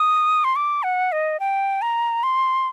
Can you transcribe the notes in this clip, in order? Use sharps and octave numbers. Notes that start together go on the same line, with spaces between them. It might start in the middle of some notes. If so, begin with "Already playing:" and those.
Already playing: D#6
C6
D6
F#5
D#5
G5
A#5
C6